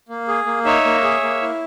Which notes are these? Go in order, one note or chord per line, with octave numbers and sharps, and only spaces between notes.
A#3
G#4
A#3
D#4 C#5 E5
A#3
G#4
A#3
E4